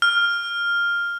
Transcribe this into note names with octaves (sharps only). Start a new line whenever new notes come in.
F6